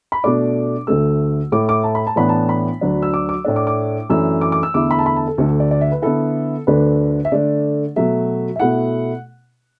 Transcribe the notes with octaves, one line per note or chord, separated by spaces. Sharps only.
B5
B2 A3 D4 D6
D2 D3 A3 E6
A2 A3 E4 D6
D6
A5
B5
A5
A2 E3 B3 D4 B5
A5
B5
D2 D3 F#3 D4
E6
D6
D6
A2 A3 D4
D6
D6
F#2 E3 A3 D4 E6
D6
D6
E6
E2 D3 A3 E4 D6
B5
A5
B5
A5
A4
D2 D3 A3 A4
D5
D5
E5
B4
D3 B3 E4 A4
D2 D3 A3 D4 B4
E5
D3 A3 D4 D5
B2 F#3 A3 E5
E5
B2 A3 E4 F#5